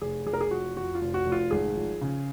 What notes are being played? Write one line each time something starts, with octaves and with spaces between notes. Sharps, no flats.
F1 G#4
F1 G#4
A#4
G#4
F3 F#4
F2 F#4
F4
F1
F#4
F1
F4
G#1 G#4
F3
C#3